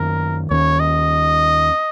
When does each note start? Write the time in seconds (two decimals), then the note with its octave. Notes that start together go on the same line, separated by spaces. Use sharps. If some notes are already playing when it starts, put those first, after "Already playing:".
Already playing: F#2 D#3 A#3 C#4 A#4
0.50 D#2 D#3 G#3 C#4 C#5
0.80 D#5